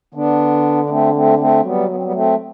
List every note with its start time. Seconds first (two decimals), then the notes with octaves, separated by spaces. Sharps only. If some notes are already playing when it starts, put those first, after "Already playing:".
0.14 D3 B3 D4
0.84 D4
0.90 A3 C4
1.14 A3 C4
1.39 A3 C4
1.64 F#3 G3 B3
1.89 B3
1.96 C4
2.03 G3 B3
2.13 A3 C4